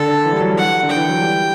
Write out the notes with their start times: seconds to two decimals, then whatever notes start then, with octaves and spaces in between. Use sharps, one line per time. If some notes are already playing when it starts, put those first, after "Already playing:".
Already playing: D3 A4
0.26 E3
0.33 G3
0.41 F#3
0.49 G3
0.57 F#5
0.83 D3
0.89 G5
0.97 E3
1.09 F#3
1.21 G3